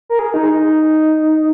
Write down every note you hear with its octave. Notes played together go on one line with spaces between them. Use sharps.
A#4
G#4
D#4
D#4